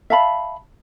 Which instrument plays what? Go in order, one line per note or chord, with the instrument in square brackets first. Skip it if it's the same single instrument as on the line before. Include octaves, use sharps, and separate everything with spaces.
[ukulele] E5 F5 A5 B5